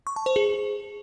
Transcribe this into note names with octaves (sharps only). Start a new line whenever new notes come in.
C#6
A5
C5
G#4